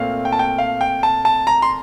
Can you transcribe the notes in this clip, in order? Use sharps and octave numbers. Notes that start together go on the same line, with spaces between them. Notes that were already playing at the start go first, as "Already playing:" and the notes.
Already playing: A#2 A3 C4 F5
G5
A5
G5
F5
G5
A5
A5
A#5
C6